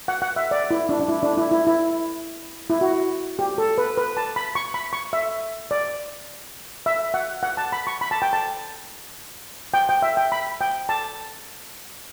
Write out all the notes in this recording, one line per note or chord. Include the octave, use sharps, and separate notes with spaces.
F#5
F#5
E5
D5
E4
D4
D4
E4
D4
E4
E4
E4
E4
F#4
G4
A4
B4
B4
A5
B5
C#6
B5
C#6
E5
D5
E5
F#5
F#5
A5
B5
C#6
B5
A5
G5
A5
G5
G5
E5
G5
B5
G5
A5